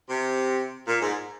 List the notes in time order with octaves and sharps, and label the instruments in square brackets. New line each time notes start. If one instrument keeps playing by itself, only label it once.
[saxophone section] C3
A#2
G#2